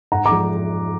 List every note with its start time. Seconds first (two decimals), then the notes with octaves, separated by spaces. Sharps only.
0.12 G#2 F#5 A#5
0.26 A#5 D6
0.31 F3 G#3